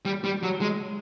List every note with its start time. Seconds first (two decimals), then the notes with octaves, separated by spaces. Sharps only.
0.05 G3
0.24 G3
0.43 F#3
0.61 G#3